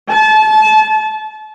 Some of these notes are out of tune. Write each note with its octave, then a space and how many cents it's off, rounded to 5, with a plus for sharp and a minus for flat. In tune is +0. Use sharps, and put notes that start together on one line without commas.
A5 -30